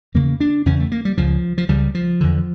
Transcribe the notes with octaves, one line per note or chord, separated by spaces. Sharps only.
E2 C#3 A#3
D4
E2 C#3 C#4
A3
A#3
G3
C#2 C#3 F3
F3
C#2 C#3 G3
F3
E2 D3